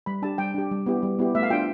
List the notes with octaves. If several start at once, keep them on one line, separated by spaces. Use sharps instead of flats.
G3 B5
D4 G4 A5
G3 G5
D4 G4
G3
B3 E4 G4
G3
B3 E4 G4
A3 E5
F5
D4 F4 G5